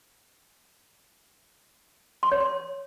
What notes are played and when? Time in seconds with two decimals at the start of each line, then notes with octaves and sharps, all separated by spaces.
2.23 C6
2.32 C#5
2.40 C6